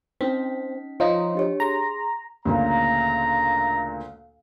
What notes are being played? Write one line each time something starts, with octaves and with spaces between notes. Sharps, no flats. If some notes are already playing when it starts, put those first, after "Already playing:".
C4 C#4 D#4 B6
F3 D#4 C#5 F5 C6
D4 G4 C#5
G#4 A#5 C6
D2 A#2 C#3 A#5